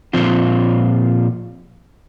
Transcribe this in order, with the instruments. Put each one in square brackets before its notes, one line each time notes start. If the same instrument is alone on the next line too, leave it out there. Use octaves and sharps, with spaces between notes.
[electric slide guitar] A#2 F3 C4 F4 C5